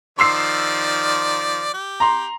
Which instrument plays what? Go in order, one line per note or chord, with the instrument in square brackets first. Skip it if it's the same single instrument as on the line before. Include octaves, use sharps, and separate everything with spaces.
[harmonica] D#3 F3 D5 [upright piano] C6 E6 C7
[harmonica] G4
[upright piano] A#5 C6